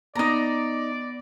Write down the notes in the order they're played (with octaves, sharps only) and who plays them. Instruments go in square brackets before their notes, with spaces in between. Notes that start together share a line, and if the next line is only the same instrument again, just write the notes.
[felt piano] B3 D6 A#6 [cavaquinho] D#4 A#5 [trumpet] D5